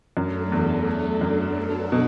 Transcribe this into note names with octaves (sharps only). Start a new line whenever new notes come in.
F#2 F#3 A3 D4 A4
E2
F#2
F#3 B3 D4 F#4 A4
B2